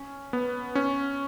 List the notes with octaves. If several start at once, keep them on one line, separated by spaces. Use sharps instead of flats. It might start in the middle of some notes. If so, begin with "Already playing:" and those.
Already playing: C#4
B3
C#4